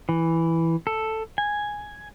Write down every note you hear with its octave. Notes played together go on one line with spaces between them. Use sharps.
E3
A4
G#5